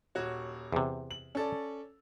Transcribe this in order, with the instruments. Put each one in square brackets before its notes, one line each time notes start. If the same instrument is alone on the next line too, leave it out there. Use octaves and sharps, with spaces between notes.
[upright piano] D#1 F#4 C#5
[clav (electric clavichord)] E2 C3
[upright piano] F#7
C#4 A4 D5